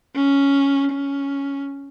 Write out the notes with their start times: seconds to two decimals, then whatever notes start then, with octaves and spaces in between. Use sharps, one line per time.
0.16 C#4
0.92 C#4